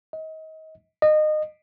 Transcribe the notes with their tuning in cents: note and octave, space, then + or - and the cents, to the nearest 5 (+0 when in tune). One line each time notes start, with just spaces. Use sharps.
D#5 +30
D#5 -25